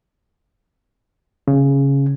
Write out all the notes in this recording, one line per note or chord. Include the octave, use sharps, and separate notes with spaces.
C#3